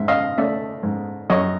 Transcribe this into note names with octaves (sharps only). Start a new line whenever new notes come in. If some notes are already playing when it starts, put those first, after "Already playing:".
Already playing: G#2 E5
D#5 F5
A3 D5 E5
G#2
F#2 C#5 D#5